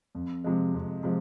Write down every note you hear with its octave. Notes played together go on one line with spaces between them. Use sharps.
F2
C3 F3 G#3
F2
C3 F3 G#3